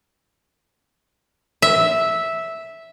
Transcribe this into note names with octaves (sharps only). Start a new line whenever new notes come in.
E5